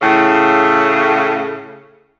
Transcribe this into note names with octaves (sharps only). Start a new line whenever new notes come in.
A2 C#3